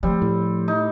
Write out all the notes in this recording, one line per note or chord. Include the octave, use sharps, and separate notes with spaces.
F3 G3 A3 C4
A2
D#4